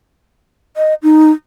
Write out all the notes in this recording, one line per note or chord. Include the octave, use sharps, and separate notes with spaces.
D#5
D#4